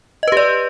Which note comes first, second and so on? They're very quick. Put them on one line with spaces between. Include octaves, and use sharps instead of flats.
D#5 B4 G4 D5